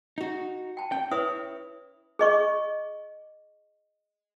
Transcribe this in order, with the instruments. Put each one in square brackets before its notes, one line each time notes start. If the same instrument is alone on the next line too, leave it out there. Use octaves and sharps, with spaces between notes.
[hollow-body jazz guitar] D#4 F#4
[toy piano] G5 A5
[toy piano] C#4 [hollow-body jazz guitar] G5
[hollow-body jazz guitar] E4 C#5 [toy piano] B4 E5 D#6
[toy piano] G#4 D#5 C#6